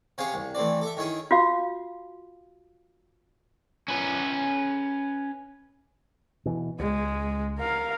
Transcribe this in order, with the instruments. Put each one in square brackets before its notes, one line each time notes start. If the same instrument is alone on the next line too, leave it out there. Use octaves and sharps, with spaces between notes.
[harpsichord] C3 C#4 G#4 F5 G#5
C2
E3 A3 C4 D5
A4 E5
D#3 C#4 E4 G#4 D#6
[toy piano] F4 F#4 F5
[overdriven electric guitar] C#4 B4
[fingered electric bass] B2 E3
[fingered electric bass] C#2 [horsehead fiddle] G#3
[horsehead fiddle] A#4 F5